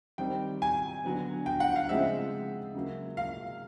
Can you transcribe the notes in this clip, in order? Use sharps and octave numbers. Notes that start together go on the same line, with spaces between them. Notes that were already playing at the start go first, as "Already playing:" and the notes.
D#3 G3 C4 G5
G#5
D3 F#3 B3
G5
F#5
F5
C#3 F3 G#3 C4 E5
C#3 F#3 A#3
F5